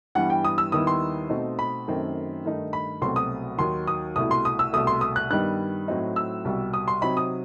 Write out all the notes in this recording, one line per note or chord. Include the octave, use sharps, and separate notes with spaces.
G2 E3 G3 B3 F#5
G5
D#6
E6
D#2 D#3 G3 B3 E4 D#6
C6
B2 A3 C4 D#4
B5
F#2 D#3 A3 C4
G2 D#3 A3 D#4
B5
C2 B2 F#3 A3 C4 C6
D#6
D#2 D#3 F#3 C6
D#6
C2 B2 A3 E4 D#6
C6
D#6
E6
C2 B2 A3 D#6
C6
D#6
F#6
G2 D#3 G3 B3 D#4 F#6
A2 F#3 C4 D#4
E6
C2 B2 G3
D#6
C6
C3 F#3 C4 D#4 B5
D#6